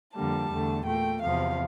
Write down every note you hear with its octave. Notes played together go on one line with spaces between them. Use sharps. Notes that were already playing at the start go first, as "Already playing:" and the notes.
F2 D3 G3 A#3 A5
E2 D3 A3
A#2 A3 G5
E2 C3 F3 F5